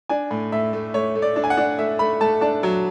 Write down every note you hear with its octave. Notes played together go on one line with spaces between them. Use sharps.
D4 G#5
A2
A2 E5
A3
A3 C#5
A3
D5
D4
G#5
F#5
D4
A3 E5
A3 B5
A3 A5
D4 A5
F#3